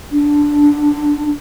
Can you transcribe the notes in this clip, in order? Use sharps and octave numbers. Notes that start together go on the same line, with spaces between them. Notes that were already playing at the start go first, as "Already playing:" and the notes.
D4